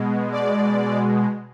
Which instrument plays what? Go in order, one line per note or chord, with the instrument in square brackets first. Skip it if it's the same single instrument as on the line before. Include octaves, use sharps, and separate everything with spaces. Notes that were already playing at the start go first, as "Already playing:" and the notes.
Already playing: [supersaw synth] B2 G#3
D5